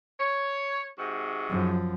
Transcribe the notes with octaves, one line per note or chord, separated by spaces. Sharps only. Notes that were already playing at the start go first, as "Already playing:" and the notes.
C#5
G#2 C3 F#4
F#2 F3